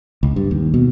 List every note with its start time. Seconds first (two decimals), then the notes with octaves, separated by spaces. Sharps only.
0.23 C#2
0.36 G2
0.51 D#2
0.74 B2